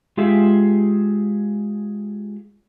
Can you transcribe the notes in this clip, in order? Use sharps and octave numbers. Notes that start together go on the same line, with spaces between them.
G#3 F4 G4 G#4 E5 F5